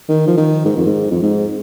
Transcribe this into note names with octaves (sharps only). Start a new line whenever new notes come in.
D#3
F3
D#3
G#2
F2
G#2
F2
G#2